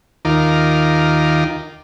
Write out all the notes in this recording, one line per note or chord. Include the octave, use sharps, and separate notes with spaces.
D#2 D#3 D#4 F4 A#4 D6